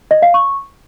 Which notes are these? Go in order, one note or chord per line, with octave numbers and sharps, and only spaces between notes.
D#5
F5
C#6